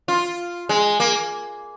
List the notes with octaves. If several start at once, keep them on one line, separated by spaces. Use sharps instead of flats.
F4
G#3
A#3